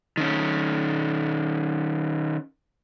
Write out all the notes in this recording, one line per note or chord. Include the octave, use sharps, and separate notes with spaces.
D#3 C#4